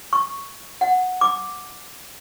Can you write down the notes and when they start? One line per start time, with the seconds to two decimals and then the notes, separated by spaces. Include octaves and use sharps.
0.13 C#6
0.81 F#5
1.21 D6